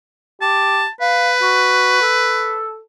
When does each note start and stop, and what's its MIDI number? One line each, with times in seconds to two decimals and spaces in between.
0.41 0.84 67
0.41 0.89 81
1.01 2.61 71
1.01 1.32 77
1.42 2.00 66
2.02 2.80 69